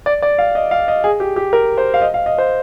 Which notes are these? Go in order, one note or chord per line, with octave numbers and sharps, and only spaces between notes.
D5
D5
F5
D#5
F5
D#5
G#4
G4
G4
A#4
C5
F5
D#5
F5
D#5
C5